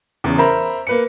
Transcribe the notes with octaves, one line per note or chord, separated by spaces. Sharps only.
E2 C#3 E3
A#4 C5 E5 A#5 B5
A#3 B4 C#7